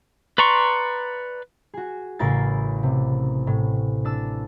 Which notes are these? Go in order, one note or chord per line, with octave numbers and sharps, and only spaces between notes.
B4 D5 A#5 C6 C#6
F#4 G#4
A1 C#3 E4 A#4 A6 C7
C3
A2
D4 A5 E6